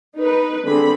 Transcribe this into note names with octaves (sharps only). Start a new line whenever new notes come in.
D#4 B4
D3 C4 G#4 A4 B5